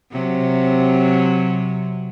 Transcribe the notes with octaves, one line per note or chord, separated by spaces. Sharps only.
C3 F#3